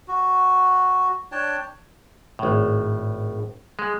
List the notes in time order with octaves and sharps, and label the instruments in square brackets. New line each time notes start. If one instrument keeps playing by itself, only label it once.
[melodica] F#4
D4 C#5 G5 A5
[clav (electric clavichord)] G#1 A2
G#3